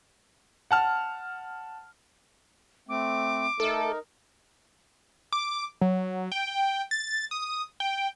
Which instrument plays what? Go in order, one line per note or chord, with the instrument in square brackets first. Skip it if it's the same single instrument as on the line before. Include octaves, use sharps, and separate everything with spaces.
[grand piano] F#5 A5 F6
[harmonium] A3 C4 [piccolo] D6
[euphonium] A3 [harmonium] D#4 A#4 [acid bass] A4
[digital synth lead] D6
F#3
G5
A6
D#6
G5